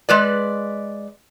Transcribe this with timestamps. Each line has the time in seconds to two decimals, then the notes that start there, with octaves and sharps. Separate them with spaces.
0.09 G#3 B4 D5